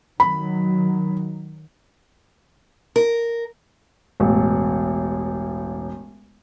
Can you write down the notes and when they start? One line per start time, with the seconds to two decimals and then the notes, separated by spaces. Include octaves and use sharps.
0.20 D#3 F#3 B5
2.96 A#4
4.20 E1 A1